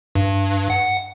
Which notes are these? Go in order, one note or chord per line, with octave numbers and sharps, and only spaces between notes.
G2
F#5